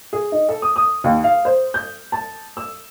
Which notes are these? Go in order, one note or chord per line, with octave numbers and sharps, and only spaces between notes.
G#4
D#4
A4
D#6
D#6
D#2
F5
C5
G6
A5
E6